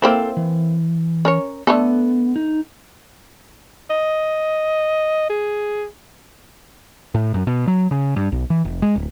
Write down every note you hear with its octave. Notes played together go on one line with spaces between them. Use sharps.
A#3 C4 E4 A4 C5
E3
C#4 A#4 C#5
D3 A3 B3 A4
D#4
D#5
G#4
A2
F#2
B2
F#3
C#3
G2
B1
E3
F1
G#3
D1